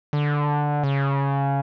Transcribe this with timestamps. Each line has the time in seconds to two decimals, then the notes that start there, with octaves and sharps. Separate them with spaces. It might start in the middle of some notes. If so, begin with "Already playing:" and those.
0.13 D3
0.83 C#3